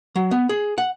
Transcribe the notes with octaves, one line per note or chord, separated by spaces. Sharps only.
F#3
B3
G#4
F#5